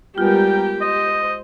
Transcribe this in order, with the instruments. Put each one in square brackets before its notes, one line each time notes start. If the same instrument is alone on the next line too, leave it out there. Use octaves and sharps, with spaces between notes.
[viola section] G3 B3 A#4 [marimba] G#3 F4 [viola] G4 [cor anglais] G5
[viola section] C5 [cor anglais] D#5